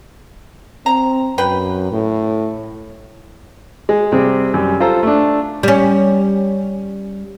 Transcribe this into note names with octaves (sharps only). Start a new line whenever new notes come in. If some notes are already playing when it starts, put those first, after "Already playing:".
C4 A#5
F#2 B4 G5
A2
G#3
C3 G3 C4 G#4
F#2 G3
F4 A4 C5 A#5
A3 D4
G3 C#4